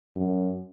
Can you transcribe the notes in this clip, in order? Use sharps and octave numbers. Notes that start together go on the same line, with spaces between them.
F#2